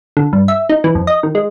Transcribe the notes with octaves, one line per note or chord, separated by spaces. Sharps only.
D3
G2
E5
D#4
E3
F2
D#5
D#3
G#3